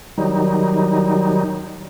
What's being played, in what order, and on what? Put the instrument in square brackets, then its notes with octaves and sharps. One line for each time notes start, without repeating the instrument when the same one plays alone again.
[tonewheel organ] D#3 F#3 G3 D#4